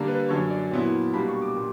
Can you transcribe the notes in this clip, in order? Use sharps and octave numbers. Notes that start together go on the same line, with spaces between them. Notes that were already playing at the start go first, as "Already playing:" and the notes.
Already playing: D3 G3 A#3 D4
B4
F#2 D3 F#3 C#5
D5
A#2 F#3 B3 E4
B2 G3 A#3 D4 B5
C#6
D6
A#2 G3